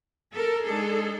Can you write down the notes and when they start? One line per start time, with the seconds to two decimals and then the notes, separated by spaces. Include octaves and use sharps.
0.31 A4 A#4
0.62 G#3 D4 D#4 G#4 A4